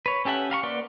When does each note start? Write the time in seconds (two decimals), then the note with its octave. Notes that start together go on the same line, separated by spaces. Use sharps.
0.06 B4 C#5
0.25 C#4 G4 A4 E5 F#5
0.50 G4 F5 A#5 C#6
0.63 A#3 B4 D5 F#5 C6